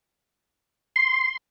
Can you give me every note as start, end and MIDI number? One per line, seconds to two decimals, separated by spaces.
0.96 1.37 84